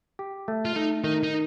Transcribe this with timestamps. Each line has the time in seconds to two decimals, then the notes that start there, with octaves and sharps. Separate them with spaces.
0.19 G4
0.48 A3
0.65 F4
0.76 A3 D#4
1.04 D#3 D#4
1.23 D#4